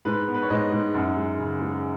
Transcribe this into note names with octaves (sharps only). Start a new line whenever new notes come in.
G#2 B4
B3
B4
C#5
G#2 D#5
G#2
F#2 F#5
G#3
C#3
G#3